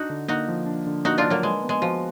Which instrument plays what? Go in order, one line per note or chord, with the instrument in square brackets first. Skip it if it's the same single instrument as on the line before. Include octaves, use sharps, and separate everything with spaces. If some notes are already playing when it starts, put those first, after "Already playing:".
Already playing: [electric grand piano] D4 [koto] D#4 F#4
[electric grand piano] D3
[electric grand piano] A#3 [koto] D#4 F#4
[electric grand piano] F3
D4
D3
[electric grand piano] A#3 [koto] D#4 F#4
[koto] D4 F4
[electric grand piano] F3
[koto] F#3 A#3
[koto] G#3 [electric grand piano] B4
[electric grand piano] B3
[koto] G#3
[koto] F3 [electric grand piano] F#4